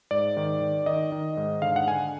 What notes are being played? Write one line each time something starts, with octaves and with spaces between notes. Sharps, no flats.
G#2 D5
D#3
D#3
D#3 D#5
D#3
G#2
D3 F5
F#5
D3 G#5